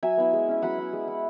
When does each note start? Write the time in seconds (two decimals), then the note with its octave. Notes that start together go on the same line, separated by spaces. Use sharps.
0.03 F#3 E5 G#5
0.17 B3 E4
0.33 G#3
0.48 C#4 E4
0.62 F#3 F#5 B5
0.78 E4
0.93 G#3
1.08 E4